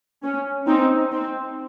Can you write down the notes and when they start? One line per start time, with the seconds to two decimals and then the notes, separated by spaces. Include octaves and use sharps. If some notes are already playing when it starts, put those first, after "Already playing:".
0.23 C#4
0.67 C4 D#4
1.12 C4